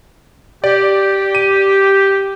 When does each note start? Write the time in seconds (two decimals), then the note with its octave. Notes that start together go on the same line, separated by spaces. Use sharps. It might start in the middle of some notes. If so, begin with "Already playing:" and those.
0.64 G4 D5
1.35 D#7